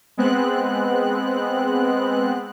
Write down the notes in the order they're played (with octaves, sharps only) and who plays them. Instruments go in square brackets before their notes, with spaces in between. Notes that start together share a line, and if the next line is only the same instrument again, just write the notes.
[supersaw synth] G#3 B3 C4 F#6